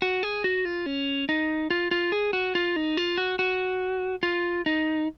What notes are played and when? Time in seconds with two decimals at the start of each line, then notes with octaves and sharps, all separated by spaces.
0.02 F#4
0.23 G#4
0.44 F#4
0.65 F4
0.86 C#4
1.29 D#4
1.70 F4
1.91 F4
2.12 G#4
2.33 F#4
2.55 F4
2.76 D#4
2.97 F4
3.17 F#4
3.39 F#4
4.23 F4
4.66 D#4